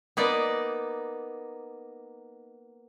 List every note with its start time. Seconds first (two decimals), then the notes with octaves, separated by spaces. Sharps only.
0.17 A#3 B3 D#4 D5